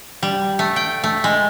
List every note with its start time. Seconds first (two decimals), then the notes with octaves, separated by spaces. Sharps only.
0.23 G3
0.59 A3
0.76 G5
1.04 A3
1.24 G#3